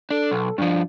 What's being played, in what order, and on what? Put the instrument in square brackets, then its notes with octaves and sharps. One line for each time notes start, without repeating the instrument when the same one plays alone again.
[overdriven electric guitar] D4 [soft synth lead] A4
[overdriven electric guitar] B1
[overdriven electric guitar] G2 F3 [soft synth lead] D4